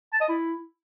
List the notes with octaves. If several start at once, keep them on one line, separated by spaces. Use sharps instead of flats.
A5
D#5
E4